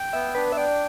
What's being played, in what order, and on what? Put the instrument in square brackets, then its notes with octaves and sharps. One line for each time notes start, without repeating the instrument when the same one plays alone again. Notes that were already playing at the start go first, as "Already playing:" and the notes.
Already playing: [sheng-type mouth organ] G5
[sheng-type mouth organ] B3 [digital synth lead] E5
[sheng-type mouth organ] D4 [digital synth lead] B4
[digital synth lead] E5
[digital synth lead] D5 [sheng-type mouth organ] G5